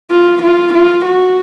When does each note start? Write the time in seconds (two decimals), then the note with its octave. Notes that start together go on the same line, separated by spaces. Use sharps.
0.11 F4
0.42 F4
0.73 F4
1.05 F#4